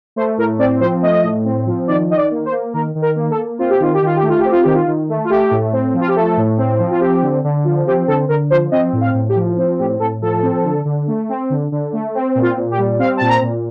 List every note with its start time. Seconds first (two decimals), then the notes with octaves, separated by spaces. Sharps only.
0.16 A3 C5
0.37 A2 A#4
0.59 C4 D5
0.80 F3 C5
1.02 A3 D#5
1.23 A2
1.45 C4
1.66 F3
1.88 D#3 D5
2.09 D#3 D#5
2.17 D5
2.31 A#3
2.45 C5
2.52 A#3
2.73 D#3 A#4
2.95 D#3
3.02 A#4
3.15 A#3
3.31 A4
3.37 A#3
3.59 C4 F4
3.70 G4
3.80 D#3 F4
3.94 G4
4.02 D#3 F4
4.16 G4
4.22 A3
4.29 F4
4.39 G4
4.45 C4
4.52 F4
4.63 D#3 G4
4.75 F4
4.87 D#3
5.09 A3
5.25 F4
5.30 A3 G4
5.51 A2
5.72 C4
5.94 F3
6.01 F4
6.08 G4
6.16 A3 A4
6.37 A2
6.58 C4
6.79 F3
6.91 F4
7.00 C4 G4
7.22 D3
7.44 D3
7.64 F3
7.86 C4 G4
8.08 D3 A4
8.29 D3 A#4
8.50 F3 C5
8.72 C4 D#5
8.93 A2
9.01 F5
9.14 A2
9.29 G4
9.36 F3
9.57 C4
9.79 A2 G4
10.00 A2 A4
10.22 F3 A4
10.42 C4
10.64 D3
10.85 D3
11.08 A3
11.29 C4
11.50 D3
11.72 D3
11.93 A3
12.15 C4
12.35 A#2
12.42 F4
12.57 A#2
12.71 G4
12.78 G3
12.99 C4 F5
13.17 A#2 A5
13.29 A#5
13.42 A#2